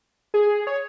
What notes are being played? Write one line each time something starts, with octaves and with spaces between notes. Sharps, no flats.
G#4
C#5